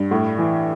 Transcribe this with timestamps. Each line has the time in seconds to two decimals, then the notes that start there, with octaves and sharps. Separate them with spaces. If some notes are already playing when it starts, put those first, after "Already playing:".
Already playing: G2
0.11 A2
0.38 E3